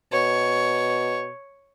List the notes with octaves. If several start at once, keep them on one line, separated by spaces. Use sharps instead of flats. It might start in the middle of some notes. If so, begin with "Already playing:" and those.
B2 C#5